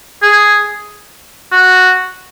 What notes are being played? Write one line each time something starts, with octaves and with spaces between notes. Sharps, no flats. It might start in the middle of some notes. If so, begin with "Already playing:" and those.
G#4
F#4